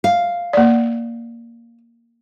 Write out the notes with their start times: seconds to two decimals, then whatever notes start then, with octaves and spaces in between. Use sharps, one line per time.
0.04 F5
0.53 A#3 D5